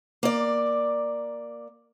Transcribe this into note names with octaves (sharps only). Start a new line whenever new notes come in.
A#3 D5